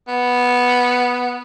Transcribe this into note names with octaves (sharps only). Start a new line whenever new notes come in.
B3